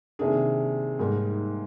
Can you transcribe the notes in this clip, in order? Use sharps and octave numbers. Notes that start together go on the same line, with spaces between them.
C3 D#3 A#3 D4 G#4
G#2 G3 A#3 D#4 A#4